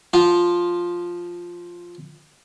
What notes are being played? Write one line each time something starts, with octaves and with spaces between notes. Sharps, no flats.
F3 F4